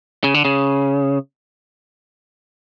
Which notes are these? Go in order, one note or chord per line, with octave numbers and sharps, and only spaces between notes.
C#3
D3
C#3